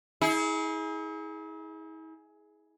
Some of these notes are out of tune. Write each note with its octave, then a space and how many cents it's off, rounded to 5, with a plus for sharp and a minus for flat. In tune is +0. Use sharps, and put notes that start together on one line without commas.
E4 -45 G#4 +10